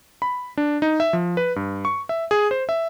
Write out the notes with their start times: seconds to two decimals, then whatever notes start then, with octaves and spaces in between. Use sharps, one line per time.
0.22 B5
0.57 D4
0.82 D#4
1.00 E5
1.13 F3
1.37 B4
1.56 G2
1.85 C#6
2.09 E5
2.31 G#4
2.51 C5
2.69 E5